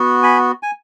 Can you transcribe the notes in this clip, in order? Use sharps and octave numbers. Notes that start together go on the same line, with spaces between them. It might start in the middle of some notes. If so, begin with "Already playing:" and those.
Already playing: B3 F#4
G#5 B5
G#5